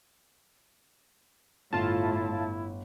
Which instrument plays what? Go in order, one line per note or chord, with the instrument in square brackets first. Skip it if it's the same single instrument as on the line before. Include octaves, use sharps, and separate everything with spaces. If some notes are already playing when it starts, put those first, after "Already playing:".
[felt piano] G1 [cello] A2 [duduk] E4 [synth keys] F4 A5